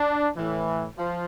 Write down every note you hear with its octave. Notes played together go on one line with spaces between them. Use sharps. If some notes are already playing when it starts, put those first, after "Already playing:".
Already playing: D4
A2 E3
F3